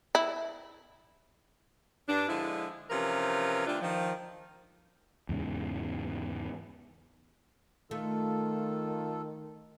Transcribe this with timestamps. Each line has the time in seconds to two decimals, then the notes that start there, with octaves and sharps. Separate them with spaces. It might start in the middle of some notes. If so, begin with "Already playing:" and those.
0.15 E4
2.08 G2 D4
2.28 D3 F3 G#3 E4
2.90 C3 E3 F3 C#4 A#4
3.67 D3 G3 A3 D4 F4
3.81 D#3 F3
5.29 E2 G#2 C#3
7.91 D#3 A3 F4 A4